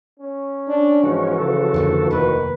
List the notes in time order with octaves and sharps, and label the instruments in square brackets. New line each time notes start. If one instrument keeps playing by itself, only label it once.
[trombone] C#4
[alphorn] D4
[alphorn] G#2 [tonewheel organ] E3 F3 F#4
[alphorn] C#3 [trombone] A4
[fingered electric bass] F2 D3 A#3
[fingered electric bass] F1 D#2 A#3 [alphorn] D#3 [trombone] B4